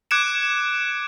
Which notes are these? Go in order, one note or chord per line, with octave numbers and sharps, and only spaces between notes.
D6 F#6 G#6 C#7 D7 E7